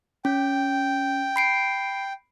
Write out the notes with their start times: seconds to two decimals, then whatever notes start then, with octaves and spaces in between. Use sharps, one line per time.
0.25 C#4 G5
1.36 B5 C7 D7